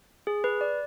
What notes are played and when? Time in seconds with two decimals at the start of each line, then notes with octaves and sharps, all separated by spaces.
0.27 G#4
0.44 B4
0.61 D5